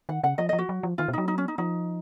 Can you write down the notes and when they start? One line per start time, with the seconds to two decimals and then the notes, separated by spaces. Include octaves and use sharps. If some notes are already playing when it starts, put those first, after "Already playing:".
0.09 D#3 F#5
0.23 C#3 F#5
0.38 F3 D#5
0.49 D#5
0.53 F3
0.58 F#4
0.69 F#3
0.83 F3
0.98 D#3 F4
1.08 B2
1.13 F#3 D#4
1.28 D#4
1.38 C#4
1.48 D#4
1.58 F3 D#4